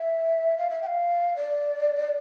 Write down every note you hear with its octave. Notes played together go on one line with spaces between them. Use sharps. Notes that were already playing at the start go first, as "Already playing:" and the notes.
Already playing: E5
F5
E5
G5
F5
D5